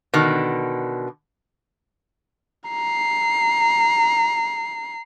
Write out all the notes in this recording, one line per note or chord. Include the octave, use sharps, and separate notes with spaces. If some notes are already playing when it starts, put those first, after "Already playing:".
B2 D3 D#3
A#5 C7